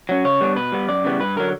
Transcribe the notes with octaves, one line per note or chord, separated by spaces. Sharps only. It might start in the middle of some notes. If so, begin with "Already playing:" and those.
F#3 C#4
C#3 C#5
G3 B3 D4
B2 B4
G3 B3
F#2 D5
C#3 E3 G3 B3
G2 B4
D3 F#3 A#4